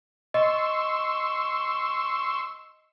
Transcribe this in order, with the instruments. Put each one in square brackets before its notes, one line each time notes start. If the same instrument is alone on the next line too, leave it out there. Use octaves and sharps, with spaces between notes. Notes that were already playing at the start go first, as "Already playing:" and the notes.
[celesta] D#5 [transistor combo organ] C6 C#6 E6